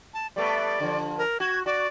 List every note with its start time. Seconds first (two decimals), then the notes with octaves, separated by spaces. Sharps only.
0.14 A5
0.36 G3 A3 B3 D5
0.80 D3 F3
1.18 A#4
1.40 F#4 G#6
1.66 F#4 D5